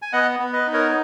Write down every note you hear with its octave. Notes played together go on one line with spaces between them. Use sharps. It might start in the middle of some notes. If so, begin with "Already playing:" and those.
G#5
B3 D#5 F#5
B3
B4 D#5
D#4
A#4 C#5